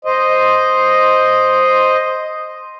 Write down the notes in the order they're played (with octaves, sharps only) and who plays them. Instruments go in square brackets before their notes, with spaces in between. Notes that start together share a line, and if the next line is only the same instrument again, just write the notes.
[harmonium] C5 D#5